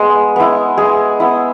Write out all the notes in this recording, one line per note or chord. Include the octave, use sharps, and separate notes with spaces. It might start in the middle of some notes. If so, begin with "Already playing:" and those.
Already playing: G#3 B3
B3 E4
G#3 G#4
B3 E4